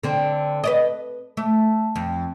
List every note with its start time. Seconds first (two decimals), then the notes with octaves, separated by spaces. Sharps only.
0.03 D3 C4
0.64 B4 D5 D#5
1.37 A3
1.96 F2